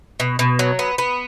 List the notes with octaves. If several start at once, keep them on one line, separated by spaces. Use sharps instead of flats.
B2
B2
F#3
B3
B3